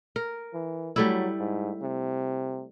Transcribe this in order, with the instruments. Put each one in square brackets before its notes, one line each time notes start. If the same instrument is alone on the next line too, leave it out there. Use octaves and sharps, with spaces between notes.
[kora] A#4
[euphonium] E3
[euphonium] F#3 [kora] G3 A3 E4
[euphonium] G#2
C3